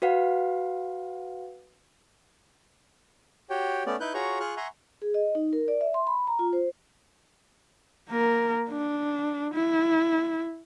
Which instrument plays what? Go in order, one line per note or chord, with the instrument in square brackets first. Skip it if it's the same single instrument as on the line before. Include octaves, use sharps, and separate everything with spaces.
[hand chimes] F#4 B4 F5 F#5
[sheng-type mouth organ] F#4 G4 C#5 G5
A3 B3 C#4 D5
D#4 E4 B4 F#6 G6
F4 F#4 G#4 C#5 A#5 C#6
F4 G#4 C#6 F6 F#6
E5 F#5 G#5 A#5 C6 C#6
[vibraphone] G#4
D#5
D#4
A#4
D5
E5
C6
B5
A#5
F4
C5
[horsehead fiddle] A#3 A#4
D4
E4